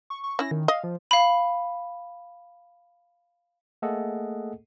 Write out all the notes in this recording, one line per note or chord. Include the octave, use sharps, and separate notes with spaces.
C#6
C#6
C#4 E4 A#6
D#3
D#5 F5
F3
F5 B5
A3 A#3 G#4 A4 D#5 F#5